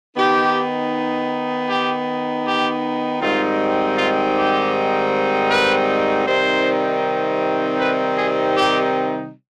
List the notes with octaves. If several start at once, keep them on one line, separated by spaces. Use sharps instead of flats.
D#3 B3 D#4 G4
G4
G4
G#2 D#3 G3 C4 D#4 F4
F4
G4
B4
C3 D#3 G3 C4 D#4 C5
B4
G#4
G4